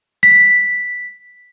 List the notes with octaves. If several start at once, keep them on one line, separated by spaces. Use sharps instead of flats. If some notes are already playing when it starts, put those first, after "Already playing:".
B6